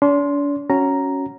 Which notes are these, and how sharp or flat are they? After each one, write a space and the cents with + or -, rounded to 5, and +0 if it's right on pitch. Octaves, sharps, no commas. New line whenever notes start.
D4 -45 C6 +0
C#4 +0 F#4 +0 A#5 +0